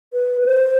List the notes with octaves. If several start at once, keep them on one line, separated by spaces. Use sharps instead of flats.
B4
B4
C5